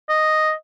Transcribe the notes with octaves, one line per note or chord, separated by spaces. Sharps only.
D#5